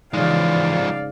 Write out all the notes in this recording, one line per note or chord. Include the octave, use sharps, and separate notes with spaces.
G#2 C#3 E3 F3 G#3 D5 F5